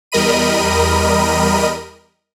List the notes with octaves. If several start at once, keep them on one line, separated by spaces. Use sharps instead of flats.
E2 G3 A#4 D#5 B5 D#7